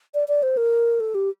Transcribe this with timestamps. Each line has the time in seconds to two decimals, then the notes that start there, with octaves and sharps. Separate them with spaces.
0.14 D5
0.28 D5
0.43 C5
0.57 A#4
1.00 A4
1.15 G4